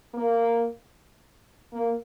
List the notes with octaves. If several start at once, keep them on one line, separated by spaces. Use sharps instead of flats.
A#3
A#3